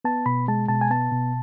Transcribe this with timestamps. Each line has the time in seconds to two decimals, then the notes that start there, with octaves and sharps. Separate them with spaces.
0.05 B3 A5
0.26 B2 B5
0.48 G#3 A5
0.68 B2 A5
0.81 G#5
0.91 B3 A5
1.12 B2